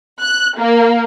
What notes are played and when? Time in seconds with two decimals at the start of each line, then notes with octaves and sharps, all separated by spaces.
0.21 F#6
0.59 A#3